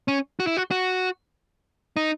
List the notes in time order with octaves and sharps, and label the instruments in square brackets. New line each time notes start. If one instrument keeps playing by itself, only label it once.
[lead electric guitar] C#4
F#4
E4
F#4
F#4
D#4